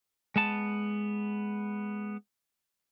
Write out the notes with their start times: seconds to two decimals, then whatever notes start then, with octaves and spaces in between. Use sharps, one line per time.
0.36 G#3 B3 A5